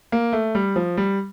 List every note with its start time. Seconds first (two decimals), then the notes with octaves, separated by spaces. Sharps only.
0.12 A#3
0.33 A3
0.55 G3
0.76 F3
0.97 G3